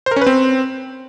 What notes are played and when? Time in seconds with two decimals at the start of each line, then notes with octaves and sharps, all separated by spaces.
0.06 C5
0.11 A#4
0.16 C#4
0.21 B4
0.27 C4